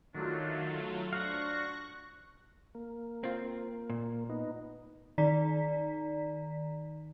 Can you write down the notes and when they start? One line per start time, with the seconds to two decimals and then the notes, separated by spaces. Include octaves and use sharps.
0.15 D#3 F#3 A3 D4 F4
1.13 D4 F#4 C5 F5 C#6 F#6 A#6
2.75 A#3
3.24 C4 F4
3.90 A#2
4.30 B3 D#4
5.18 D#3 D#4 D5 A#5 B6